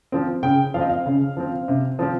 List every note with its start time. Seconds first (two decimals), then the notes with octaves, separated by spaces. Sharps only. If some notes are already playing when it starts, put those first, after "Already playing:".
0.12 F3 C4
0.43 C#3 G5
0.74 F3 F5
0.79 C4 D#5
0.89 F5
1.06 C#3
1.37 F3 C4
1.68 C3
1.99 F3 C4